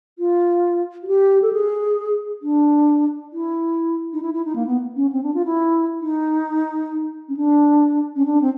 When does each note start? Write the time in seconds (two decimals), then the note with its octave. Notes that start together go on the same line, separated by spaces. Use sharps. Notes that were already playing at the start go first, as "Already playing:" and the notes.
0.19 F4
1.03 F#4
1.07 G4
1.42 A4
1.53 G#4
2.42 D4
3.33 E4
4.13 D#4
4.22 E4
4.34 E4
4.45 D#4
4.56 A#3
4.67 B3
4.96 C#4
5.12 C4
5.23 D4
5.34 F4
5.45 E4
6.01 D#4
7.29 C#4
7.37 D4
8.16 C#4
8.25 D4
8.42 C4